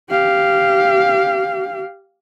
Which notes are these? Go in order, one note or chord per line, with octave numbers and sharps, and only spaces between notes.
G4 F5